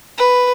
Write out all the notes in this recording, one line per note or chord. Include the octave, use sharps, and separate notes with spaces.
B4